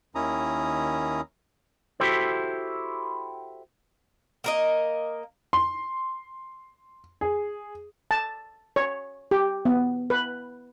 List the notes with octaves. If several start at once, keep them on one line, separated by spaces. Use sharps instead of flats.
D#2 D#3 C#4 E4 A#5 D#6
E4 F#4 G4 A4 C5
A#3 A#4 D#5
C6
G#4
A5
C#5
G4
B3
B4